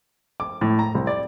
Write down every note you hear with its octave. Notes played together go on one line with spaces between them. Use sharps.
D6
A2
A#5
C2
D5